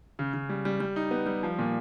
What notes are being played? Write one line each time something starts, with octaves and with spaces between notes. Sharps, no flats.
C#3
C#3
G3
G3
G3
D#4
B3
G3
F3
A#2